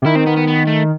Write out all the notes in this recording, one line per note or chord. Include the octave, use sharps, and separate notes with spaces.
C3
D#3 E4
C4
B3
B3
B3
A3